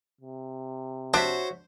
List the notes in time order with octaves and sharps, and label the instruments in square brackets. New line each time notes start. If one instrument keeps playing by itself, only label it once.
[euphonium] C3
[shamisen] D4 [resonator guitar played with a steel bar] F#4 C#5 E5 [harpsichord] C5